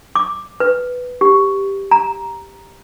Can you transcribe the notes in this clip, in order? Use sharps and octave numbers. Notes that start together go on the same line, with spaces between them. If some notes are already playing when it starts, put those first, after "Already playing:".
D6
B4
G4
A#5